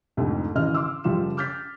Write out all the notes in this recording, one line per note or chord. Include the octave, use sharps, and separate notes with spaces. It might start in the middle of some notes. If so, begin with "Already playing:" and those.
C2 F2 G#2 D3 A3
G#1 C#3 E3 D#5 F6
C6 D6 E6
F#1 F3 G3 F4 E7
D6 F6 G6 A6 B6